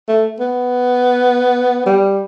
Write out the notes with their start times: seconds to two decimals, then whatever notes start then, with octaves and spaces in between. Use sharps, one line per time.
0.08 A3
0.40 B3
1.86 G3